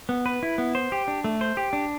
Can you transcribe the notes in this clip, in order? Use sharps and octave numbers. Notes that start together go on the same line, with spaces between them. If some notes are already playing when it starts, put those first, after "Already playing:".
B3
B4
E4
B3
C5
G4
D4
A3
C5
G4
D4